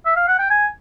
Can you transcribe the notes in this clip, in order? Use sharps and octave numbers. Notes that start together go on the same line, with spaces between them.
E5
F5
F#5
G5
G#5